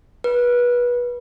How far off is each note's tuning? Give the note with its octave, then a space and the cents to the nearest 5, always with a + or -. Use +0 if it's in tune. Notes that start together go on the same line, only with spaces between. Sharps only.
B4 -25